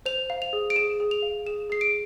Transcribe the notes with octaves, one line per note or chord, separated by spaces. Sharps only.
C5 F7
F5
F7
G#4
D7
G#4 E7
G#4
F7
F5
G#4 E7
G#4 C7
D7